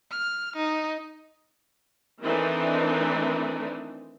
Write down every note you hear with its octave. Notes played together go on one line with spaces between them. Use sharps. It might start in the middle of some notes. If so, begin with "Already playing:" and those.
F6
D#4
D#3 E3 A3 C4 D4 D#4